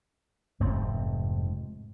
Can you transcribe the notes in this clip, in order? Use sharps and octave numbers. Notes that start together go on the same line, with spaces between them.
F1 G#2 A3 C4